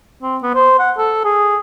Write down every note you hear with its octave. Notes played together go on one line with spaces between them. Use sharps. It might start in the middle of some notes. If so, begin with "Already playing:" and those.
C4
B3
C5
F#5
A4
G#4